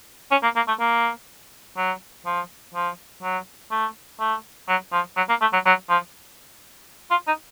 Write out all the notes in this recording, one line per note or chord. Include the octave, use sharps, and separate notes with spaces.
C#4
A#3
A#3
A3
A#3
F#3
F3
F3
F#3
A3
A3
F#3
F3
F#3
A#3
A3
F#3
F#3
F3
F4
D#4